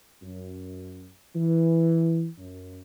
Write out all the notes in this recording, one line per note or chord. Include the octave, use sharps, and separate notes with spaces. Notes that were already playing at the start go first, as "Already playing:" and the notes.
F#2
E3
F#2